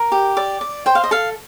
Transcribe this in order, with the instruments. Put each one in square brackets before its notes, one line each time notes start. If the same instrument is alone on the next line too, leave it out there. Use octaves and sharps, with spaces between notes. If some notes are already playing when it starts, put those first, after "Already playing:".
Already playing: [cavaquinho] A#4
G4
D5 D6
D5
C5 G5
F5
D#5
A4 F5